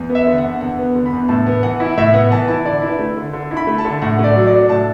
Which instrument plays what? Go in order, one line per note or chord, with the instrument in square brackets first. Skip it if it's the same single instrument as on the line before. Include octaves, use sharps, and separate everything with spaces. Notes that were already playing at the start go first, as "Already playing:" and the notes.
Already playing: [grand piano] E2
B3
E5
D3
F#5
E2
E2 F#5
B3
D3
B5
E2
A2 A5
B3
E3 F#5
E4
A2 E5
B3 F#5
E3 A5
E4 A5
D3 D5
E4
B4
A3
D3
D3
E4
B5
A3
A5
D3
A2 F#5
A3
D5
F#3
D5
D4
A2 A5